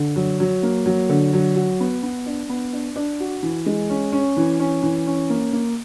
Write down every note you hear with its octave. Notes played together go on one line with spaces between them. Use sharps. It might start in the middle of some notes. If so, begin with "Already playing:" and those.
Already playing: D3
F#3
F#3
A#3
F#3
D3
F#3
F#4
B3
B3
D4
B3
D4
D4
F#4
E3
G#3
C#4
C#4
E3
C#4
E3
C#4
A#3
A#3